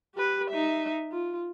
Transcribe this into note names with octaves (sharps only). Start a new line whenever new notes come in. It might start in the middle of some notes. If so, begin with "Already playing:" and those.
G4 B4
D#4 E5
F4